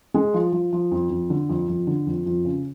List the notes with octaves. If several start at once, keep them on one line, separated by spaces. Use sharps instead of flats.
G#3
F3
F3
F3
F2
F2
D3
F2
F2
D3
F2
F2
C#3